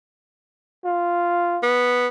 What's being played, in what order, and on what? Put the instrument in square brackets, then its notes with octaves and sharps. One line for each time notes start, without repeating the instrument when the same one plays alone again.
[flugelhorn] F4
[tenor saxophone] B3